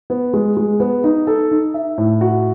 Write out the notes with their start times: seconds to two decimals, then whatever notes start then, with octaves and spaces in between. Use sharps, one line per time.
0.10 B3
0.33 G#3
0.57 G#3
0.80 B3
1.04 D#4
1.27 A4
1.51 D#4
1.74 E5
1.98 A2
2.21 F#4